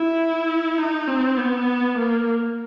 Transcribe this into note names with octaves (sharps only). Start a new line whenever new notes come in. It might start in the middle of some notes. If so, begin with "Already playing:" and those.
Already playing: E4
D#4
C4
B3
A#3